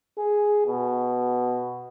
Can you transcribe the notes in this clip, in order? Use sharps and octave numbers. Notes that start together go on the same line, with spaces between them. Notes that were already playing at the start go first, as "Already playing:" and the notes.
G#4
B2